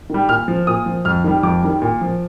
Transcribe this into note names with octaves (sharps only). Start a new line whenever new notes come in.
D#3 G3
A#2 F6
F3
A#2 D#6
F3
F2 F6
D#3 G3
F2 D6
D#3 G3
A#2
F3